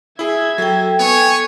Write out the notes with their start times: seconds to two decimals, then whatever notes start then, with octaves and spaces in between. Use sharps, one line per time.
0.19 E4 G#4 E5 G#6
0.58 F#3 A4 G5
1.00 B3 C#5 G#5 C#6